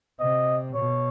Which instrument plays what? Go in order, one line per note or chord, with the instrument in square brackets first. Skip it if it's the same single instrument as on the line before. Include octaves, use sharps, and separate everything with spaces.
[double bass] C3 [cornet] D#5
[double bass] B2 [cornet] C#5